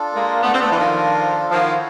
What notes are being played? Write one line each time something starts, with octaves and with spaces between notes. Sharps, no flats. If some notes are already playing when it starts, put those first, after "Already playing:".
Already playing: D4 F4 A4
G#3 A#3
A3 B3
C4
A3 B3
E3
D#3 F3
D#3 F3 E4 A4 C#5 F#5